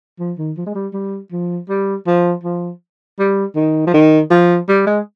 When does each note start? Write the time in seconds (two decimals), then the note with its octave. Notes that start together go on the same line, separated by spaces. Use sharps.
0.19 F3
0.38 D#3
0.57 F3
0.66 G#3
0.75 G3
0.93 G3
1.32 F3
1.69 G3
2.07 F3
2.44 F3
3.19 G3
3.56 D#3
3.87 F3
3.94 D#3
4.30 F3
4.69 G3
4.86 G#3